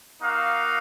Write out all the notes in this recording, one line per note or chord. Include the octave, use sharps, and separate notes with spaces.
A#3 D#4 F#4 F5